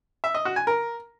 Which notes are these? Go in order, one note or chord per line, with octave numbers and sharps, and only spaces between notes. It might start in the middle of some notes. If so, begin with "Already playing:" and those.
E5
D#5
F#4
G#5
A#4